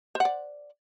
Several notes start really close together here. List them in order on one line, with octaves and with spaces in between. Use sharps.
C5 F#5 D5